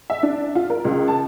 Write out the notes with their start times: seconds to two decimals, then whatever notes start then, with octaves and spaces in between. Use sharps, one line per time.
0.10 E5
0.23 D4
0.55 F4
0.70 A#4
0.85 C#2
1.08 A5